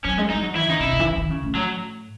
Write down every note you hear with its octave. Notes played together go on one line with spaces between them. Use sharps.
F#3 C#4
G#3
G#3 D#4
F#3
E3 E4
C#3 D#4
C3 E4
C#3
E3
D#3
D#3
C#3
A2
F#3